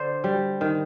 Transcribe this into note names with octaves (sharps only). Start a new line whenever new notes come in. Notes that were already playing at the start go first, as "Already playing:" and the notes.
Already playing: D3 C5 D5
G3
D#3